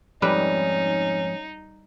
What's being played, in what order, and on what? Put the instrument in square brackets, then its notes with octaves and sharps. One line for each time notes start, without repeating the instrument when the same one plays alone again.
[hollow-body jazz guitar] F2 G#2 [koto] G3 B4 [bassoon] C#4 [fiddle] D#4